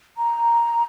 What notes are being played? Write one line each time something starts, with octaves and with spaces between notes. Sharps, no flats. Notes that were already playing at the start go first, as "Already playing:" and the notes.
A#5